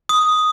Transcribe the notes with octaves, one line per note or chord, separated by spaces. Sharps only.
D#6